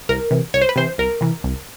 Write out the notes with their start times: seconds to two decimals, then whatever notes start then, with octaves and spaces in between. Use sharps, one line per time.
0.09 C2 A#4
0.31 C3 E3
0.54 C2 C#5
0.61 C5
0.69 B4
0.76 C3 E3 C5
0.98 C2 A#4
1.21 C3 E3
1.44 C2